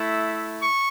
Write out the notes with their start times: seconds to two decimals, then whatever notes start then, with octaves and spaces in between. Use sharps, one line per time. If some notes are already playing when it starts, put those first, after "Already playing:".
Already playing: A3 E4
0.59 C#6